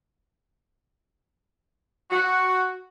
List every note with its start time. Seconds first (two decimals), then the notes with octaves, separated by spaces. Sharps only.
2.10 F#4